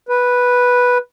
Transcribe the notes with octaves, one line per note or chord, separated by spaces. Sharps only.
B4